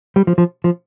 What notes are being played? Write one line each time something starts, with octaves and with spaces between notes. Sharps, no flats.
G3
F3
F3
F3